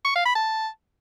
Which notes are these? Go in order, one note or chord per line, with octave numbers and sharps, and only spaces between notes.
C#6
F5
B5
A5